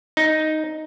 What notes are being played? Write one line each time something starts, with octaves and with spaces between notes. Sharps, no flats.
D#4